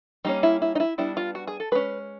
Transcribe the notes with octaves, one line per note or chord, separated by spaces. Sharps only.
G3 A#3 C#4 D#4
E4
E4
D#4
E4
G3 B3 D4 E4
F4
F#4
G#4
A4
G#3 C#4 B4